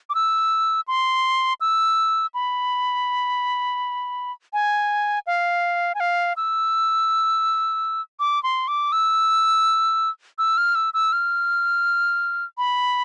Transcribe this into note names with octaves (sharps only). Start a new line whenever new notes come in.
D6
E6
C6
E6
B5
G#5
F5
G#5
F5
E6
D6
C6
D6
E6
E6
F6
E6
E6
F6
B5